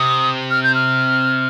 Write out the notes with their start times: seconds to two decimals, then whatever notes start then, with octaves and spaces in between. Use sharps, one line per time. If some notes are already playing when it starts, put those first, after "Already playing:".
Already playing: C3 D#6
0.51 F6
0.64 G6
0.75 F6